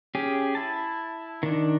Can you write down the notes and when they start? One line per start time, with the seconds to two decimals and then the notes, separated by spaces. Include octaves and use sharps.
0.15 C#4 G4 G#4
0.55 E4 A5
1.43 D#3 D4